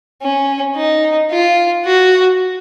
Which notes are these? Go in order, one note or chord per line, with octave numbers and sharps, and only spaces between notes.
C#4
D#4
F4
F#4